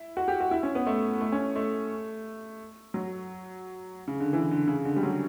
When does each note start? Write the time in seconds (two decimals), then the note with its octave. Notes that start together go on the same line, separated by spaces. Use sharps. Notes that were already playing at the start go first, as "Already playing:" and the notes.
Already playing: E4
0.17 F#4
0.28 G4
0.40 F#4
0.51 E4
0.63 C#4
0.75 B3
0.87 A3
1.21 A3
1.32 C#4
1.56 A3
2.94 F#3
4.08 C#3
4.20 D3
4.33 E3
4.51 D3
4.68 C#3
4.85 D3
4.96 G3
5.03 F#3